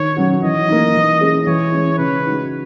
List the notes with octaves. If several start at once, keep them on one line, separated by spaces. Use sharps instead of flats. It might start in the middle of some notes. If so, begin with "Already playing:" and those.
Already playing: D#3 C#5
F#3 C#4 F#4
E3 D#5
A#3 D#4
E3
G#3 C#4 G#4
E3 C#5
G#3 C#4
C#3 B4
G#3 D#4 F#4